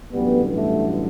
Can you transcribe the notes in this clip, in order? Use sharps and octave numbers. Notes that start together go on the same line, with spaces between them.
A1 G2 D3 F#3 G3 B3
A3